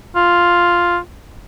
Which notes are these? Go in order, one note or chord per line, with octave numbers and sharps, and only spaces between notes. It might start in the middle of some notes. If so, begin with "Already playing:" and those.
F4